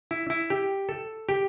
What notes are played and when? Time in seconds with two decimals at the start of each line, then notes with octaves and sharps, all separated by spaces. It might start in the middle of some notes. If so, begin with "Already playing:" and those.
0.11 E4
0.30 E4
0.50 G4
0.89 A4
1.29 G4